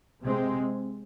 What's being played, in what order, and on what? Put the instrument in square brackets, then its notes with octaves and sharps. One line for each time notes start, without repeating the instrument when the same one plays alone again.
[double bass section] C3 G#3 C4